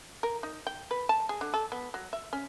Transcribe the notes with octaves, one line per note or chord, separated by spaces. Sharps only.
A#4
D#4
G5
B4
A5
G#4
D3
A4
B3
F#3
E5
C#4